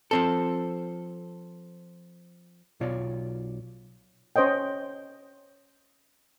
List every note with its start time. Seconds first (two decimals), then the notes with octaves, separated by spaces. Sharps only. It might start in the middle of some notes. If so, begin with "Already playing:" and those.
0.11 F3 C4 A4
2.80 B1 B2 F4 C#5 D5
4.36 C#4 C5 C#5 D#5 G5